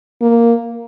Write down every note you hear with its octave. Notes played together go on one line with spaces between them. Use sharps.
A#3